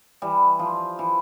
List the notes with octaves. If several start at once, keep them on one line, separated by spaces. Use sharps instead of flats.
E3 G3
F3
E3